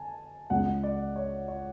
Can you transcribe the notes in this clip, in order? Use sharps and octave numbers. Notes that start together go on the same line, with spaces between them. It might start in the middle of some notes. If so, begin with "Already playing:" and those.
Already playing: D3 G#5 A5
C#2 C#3 G#3 F#5
D5
C#5
C#5